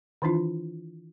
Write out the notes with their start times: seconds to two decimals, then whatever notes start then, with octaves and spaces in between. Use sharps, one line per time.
0.22 D#3 E3 D4 E4 F4